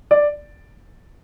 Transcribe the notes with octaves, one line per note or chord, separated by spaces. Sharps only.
D5